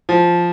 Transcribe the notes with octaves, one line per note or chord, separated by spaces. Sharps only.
F3